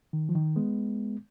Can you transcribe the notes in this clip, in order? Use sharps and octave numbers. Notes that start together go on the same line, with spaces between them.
D#3
F3
D#3
G#3 B3